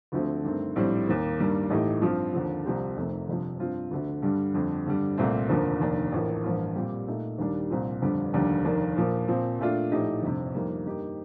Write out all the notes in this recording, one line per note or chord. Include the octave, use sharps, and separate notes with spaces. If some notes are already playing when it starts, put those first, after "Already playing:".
D2 D3 F3 A3 C4
G2 D#3 A3 C4
A#1 A2 G3 C4
D#2 D#3 A#3
G2 D#3 G3 A#3
A1 A2 A3 D#4 G4
G2 F3 C4 F4
D#2 D3 F3
C2 C3 F3 C4 G4
F1 F2 C3 D#3 A3
G1 F2 C3 F3
G2 F3 C4 F4
D2 D3 A3
G2 D3 G3
F2 D3 G3 C4
G2 D3 G3
C2 A#2 A3 C4
F1 D#2 D3 F3 A#3
F1 D#2 D#3 A#3 D4
A1 A2 F3 A#3
A1 G2 F3 A#3 F4
A#2 G3 C4 G4
A#2 A3 D#4
D#2 D#3 G3 D4 G4
C2 A#2 F3 C4
G1 F2 D3 G3
F1 D#2 D3 G3 D4
F1 D#2 D#3 A#3 D4
A#2 F3 A#3
A#2 F3 C4
A#2 A3 D4 F4
A#1 A2 A3 D#4 G4
G1 F2 C3
F2 D#3 G3 A#3
G2 D#3 A#3 D#4 G4